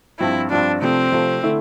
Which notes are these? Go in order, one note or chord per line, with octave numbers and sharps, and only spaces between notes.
G2 F3 C4 E4 F4
G2 F3 C4 D4 F4
C3 F3 A3 C4
C3 F3 A3
D3 A3 E4